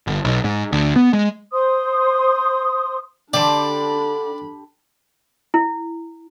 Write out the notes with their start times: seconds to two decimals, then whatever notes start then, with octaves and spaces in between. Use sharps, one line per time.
0.07 G1
0.24 B1
0.44 G#2
0.72 D2
0.96 B3
1.13 G#3
1.52 C5 C6 D#6
3.33 D3 D4 G4 D5 A5 B5 C6
5.54 E4